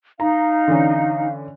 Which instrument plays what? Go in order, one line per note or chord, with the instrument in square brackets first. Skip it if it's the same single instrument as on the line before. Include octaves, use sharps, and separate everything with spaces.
[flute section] D#4 [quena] F5 [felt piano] A#5
[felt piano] D3 E3 C#4